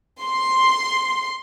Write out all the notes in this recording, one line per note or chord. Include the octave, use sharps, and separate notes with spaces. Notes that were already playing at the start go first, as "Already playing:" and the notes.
C6